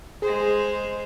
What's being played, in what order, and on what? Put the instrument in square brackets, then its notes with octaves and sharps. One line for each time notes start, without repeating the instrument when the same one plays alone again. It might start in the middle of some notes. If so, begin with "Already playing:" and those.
[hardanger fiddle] G#3 C5 [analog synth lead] G#4